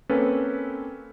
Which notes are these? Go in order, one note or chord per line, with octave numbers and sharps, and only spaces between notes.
A#3 C4 C#4 A4 B4